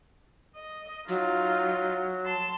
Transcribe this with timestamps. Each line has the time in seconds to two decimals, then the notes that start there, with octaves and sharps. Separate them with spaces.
0.56 D#5
1.08 F#3 D#4 F4
2.25 A5 C6